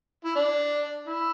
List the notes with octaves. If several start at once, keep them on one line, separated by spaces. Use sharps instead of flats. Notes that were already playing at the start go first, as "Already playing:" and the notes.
E4
D4
E4